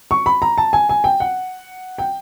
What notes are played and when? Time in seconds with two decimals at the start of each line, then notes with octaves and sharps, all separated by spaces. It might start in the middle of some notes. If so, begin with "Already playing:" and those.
0.11 C#6
0.26 B5
0.42 A#5
0.58 A5
0.73 G#5
0.89 G#5
1.04 G5
1.20 F#5
1.98 G5